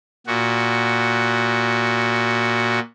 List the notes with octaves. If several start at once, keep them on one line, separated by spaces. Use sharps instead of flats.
A#2 F#4